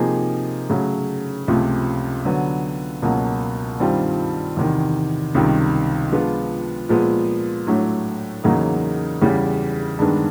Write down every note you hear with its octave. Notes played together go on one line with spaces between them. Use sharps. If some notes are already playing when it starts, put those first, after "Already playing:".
Already playing: C3 F3 A#3 D#4 G#4
C#3 F#3 A3
C#2 C3 F3 A3
D3 F#3 B3
C#2 B2 F#3 A#3
G2 D#3 G3 C4 F4
E2 C3 D#3
C#2 C3 D#3 G3
F3 G#3 B3 D4 F4
A#2 F3 G#3 B3
A2 F#3 A3 D4
E2 C#3 F#3 A#3 D#4
E2 C#3 E3 G3
G2 D#3 G#3 B3 D4